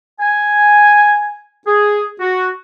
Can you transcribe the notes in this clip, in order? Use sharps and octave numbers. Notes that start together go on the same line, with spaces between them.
G#5
G#4
F#4